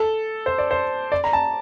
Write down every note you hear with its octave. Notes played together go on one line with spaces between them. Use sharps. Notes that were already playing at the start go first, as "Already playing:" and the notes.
Already playing: A4
C5
D5
C5
D5
A#5
A5